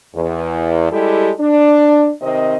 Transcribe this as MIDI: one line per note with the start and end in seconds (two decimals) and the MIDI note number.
0.14 0.87 40
0.91 1.31 55
0.91 1.31 56
0.91 1.31 64
0.91 1.31 67
0.91 1.31 69
1.40 2.10 62
2.21 2.56 48
2.21 2.56 51
2.21 2.56 60
2.21 2.56 75